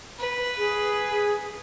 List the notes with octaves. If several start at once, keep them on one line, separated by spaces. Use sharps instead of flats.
B4
G#4